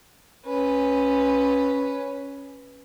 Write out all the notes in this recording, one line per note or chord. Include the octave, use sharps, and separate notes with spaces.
C#4 B4